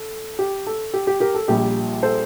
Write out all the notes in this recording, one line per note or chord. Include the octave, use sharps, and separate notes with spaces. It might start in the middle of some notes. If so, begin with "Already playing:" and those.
Already playing: A4
G4
A4
G4
G4
G4 A#4
A4
A#1 A#2 G3 G4
A4 C5